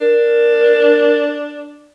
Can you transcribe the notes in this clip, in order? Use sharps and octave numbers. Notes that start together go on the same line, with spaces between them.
D4 A#4